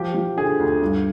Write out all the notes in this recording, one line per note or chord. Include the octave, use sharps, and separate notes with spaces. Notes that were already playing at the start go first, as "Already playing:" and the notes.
Already playing: F3 G4
F3
D3 G#4
D2
G2